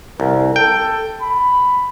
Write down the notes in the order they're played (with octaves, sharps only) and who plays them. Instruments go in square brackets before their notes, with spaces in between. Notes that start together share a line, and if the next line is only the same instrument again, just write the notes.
[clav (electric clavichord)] C2 [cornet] A#4
[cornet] A4 [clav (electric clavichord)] G5
[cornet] B5